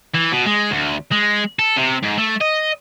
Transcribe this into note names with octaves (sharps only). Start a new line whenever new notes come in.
E3
B2
G#3
D2
G#3
A4
C3
G#2
A3
D#5